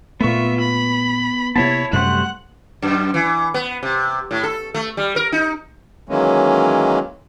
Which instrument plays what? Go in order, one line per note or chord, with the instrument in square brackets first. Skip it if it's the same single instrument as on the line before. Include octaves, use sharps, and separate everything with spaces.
[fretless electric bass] A#2 A3 [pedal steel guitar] B3 C#6 [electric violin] F4 E5
[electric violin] B5
[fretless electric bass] C3 A#3 B3 [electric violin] E4 C#5 [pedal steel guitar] A5 B5
[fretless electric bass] F#2 C3 [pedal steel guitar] G3 A3 C5 [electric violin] F#5 F#6
[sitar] F#2
E3
B3
C3
A2
A4
A3
G3
A#4
D#4
[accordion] D#3 E3 F#3 G#3 A#3 C#4